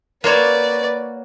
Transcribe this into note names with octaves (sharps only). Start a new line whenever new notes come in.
A#3 F#4 B4 C#5 D5